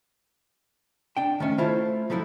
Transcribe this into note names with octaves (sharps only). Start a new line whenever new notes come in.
D4 G5
D#3 A3 C#4
A3 E4 F4 C5 A5
F3 F#3 A3 E4